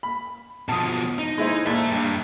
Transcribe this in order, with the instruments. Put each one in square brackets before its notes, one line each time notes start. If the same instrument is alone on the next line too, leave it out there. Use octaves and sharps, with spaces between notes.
[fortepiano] B5
[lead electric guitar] B2 F3 [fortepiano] A5 D#6
[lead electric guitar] D#4
[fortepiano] G#3 E4 C5
[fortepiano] A#1 [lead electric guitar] E5 A5
[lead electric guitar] G2